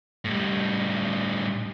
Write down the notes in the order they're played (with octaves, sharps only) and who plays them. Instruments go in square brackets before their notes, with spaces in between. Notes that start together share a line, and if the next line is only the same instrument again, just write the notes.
[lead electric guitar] A2 G3